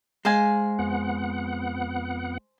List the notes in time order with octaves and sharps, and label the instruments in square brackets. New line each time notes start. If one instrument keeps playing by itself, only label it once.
[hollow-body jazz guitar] G#3 [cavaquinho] C5 F5 G#5
[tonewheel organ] F2 B3 F#5